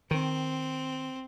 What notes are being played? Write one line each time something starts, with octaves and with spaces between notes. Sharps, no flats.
D#3 C4